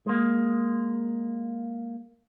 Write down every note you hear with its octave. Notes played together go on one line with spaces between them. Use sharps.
G#3 A#3